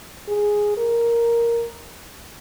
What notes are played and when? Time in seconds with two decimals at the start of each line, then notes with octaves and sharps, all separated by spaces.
0.29 G#4
0.77 A#4